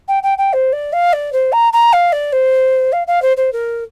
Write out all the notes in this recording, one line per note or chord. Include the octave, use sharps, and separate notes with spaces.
G5
G5
G5
C5
D5
F5
D5
C5
A#5
A#5
F5
D5
C5
F5
F5
C5
C5
A#4